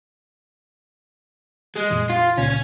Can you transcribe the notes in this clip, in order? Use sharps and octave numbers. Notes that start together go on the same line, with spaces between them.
G#3
F2 A#2 E3
F4
C#2 A#2 C#3 C#4
C#4